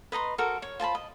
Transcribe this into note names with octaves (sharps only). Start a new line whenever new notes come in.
B4 D#5 A#5 C6
F#4 A4 A#4 C5
C#5
F4 C5 A5 B5
D#5